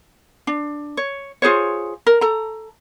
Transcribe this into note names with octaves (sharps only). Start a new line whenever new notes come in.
D4
C#5
F4 G#4 C5 C#5
A#4
A4 A#5